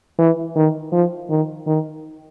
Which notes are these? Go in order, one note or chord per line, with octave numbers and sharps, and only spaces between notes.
E3
D#3
F3
D#3
D#3